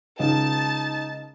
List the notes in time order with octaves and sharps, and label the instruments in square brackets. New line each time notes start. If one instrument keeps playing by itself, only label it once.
[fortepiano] C#2 D#3 [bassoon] D#4 [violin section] A5